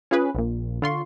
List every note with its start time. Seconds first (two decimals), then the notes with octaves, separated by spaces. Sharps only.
0.11 C#4 F4 G#4 B4
0.35 A#1 A#2
0.82 D3 F4 C6 C#6